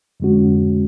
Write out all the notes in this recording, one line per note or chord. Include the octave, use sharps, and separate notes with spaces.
F2 D3 G#3 C#4 F#4